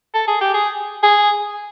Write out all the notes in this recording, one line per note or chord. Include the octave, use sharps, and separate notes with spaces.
A4
G#4
G4
G#4
G#4